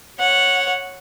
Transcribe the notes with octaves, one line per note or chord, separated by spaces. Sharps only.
C#5 F#5